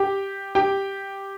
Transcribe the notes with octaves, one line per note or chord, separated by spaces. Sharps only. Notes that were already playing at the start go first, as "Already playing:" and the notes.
Already playing: G4 G5
G4 G5